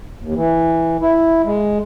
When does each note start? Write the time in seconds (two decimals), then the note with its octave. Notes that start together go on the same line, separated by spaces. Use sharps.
0.21 D#2
0.35 E3
1.01 E4
1.45 G#3